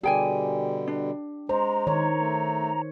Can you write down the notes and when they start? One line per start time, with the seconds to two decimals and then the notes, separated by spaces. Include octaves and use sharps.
0.04 B2 D3 G3 G4 G#4 G5 G#5
0.87 D4
1.49 G#3 C5 A#5
1.87 D#3 C#5
2.19 A3